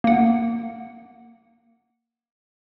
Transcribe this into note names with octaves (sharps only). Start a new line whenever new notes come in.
A#3 F#5